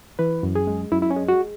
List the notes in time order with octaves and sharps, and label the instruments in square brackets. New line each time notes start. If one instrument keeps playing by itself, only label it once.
[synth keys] E3 B4
F#2
G#4
G#3
F#2 E4
E4
C#4
G#3
F#4